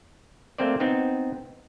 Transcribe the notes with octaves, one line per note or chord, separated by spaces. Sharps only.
A3 A#3 C4 C5 D5
B3 C4 D#4